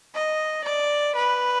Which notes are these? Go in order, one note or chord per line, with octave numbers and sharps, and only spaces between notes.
D#5
D5
B4